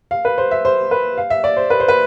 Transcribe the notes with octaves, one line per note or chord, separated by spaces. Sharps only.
F5
B4
C5
E5
C5
B4
F5
E5
D5
C5
B4
C5
B4